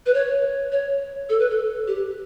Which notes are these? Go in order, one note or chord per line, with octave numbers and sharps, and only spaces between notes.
B4
C#5
C#5
A4
B4
A4
G4